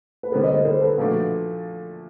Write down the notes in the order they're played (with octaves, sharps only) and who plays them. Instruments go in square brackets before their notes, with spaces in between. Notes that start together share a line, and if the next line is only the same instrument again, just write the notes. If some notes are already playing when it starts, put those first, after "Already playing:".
[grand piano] B4
[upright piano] D3 G3 B3 [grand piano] A#4 C5
[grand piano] C#5 D#5
A#4 C5
A#4 C5
A4 B4
[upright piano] A#2 F3 A3 D4 F#4